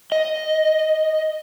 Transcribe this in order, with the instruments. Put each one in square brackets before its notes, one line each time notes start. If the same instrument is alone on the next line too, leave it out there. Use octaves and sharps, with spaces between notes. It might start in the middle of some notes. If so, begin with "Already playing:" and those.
[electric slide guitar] D#5